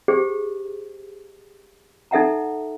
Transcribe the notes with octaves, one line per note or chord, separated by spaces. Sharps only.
G4 G#4 C5
D#4 A4 E5 F#5 A#5